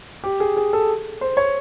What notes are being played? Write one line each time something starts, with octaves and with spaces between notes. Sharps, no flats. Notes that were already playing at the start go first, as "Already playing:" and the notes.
G4
G#4
G#4
A4
C5
C#5